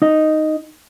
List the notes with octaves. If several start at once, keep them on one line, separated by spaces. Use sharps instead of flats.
D#4 D#5